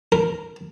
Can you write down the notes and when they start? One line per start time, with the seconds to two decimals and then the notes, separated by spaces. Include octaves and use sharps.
0.12 A#4